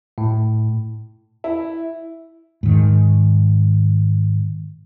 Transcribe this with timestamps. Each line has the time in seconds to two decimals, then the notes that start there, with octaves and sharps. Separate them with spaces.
0.18 A2
1.44 E4
2.63 G#2 D#3